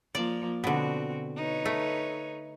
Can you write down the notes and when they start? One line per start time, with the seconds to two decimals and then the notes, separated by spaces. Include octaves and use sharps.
0.15 F3 A#3 D5
0.64 B2 D3 C4 F#4
1.36 D#4 B4 C#5
1.65 A3